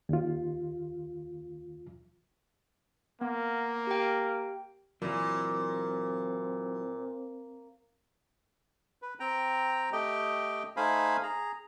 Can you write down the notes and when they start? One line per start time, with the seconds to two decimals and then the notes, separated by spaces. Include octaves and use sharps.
0.09 D#2 F4
3.21 A#3 B3
3.87 G4 G5
5.02 A#2 E3 F#3 C4
9.02 B4
9.20 C4 G5 A#5
9.92 A3 G4 D#5 G5
10.77 A3 D#4 C5 F5 G#5 B5
11.23 G#4 A#5